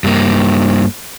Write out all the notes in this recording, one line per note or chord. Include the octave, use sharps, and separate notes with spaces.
G2 A#3